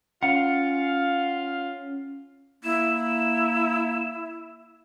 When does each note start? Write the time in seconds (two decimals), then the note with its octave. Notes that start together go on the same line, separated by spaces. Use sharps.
0.23 C#4 F4 F5 F#5
2.64 A#3 E4 E7